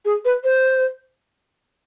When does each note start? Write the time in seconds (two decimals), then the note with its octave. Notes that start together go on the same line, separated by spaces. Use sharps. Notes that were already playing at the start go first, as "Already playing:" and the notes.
0.05 G#4
0.25 B4
0.44 C5